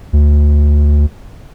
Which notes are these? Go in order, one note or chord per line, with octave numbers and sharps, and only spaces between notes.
D2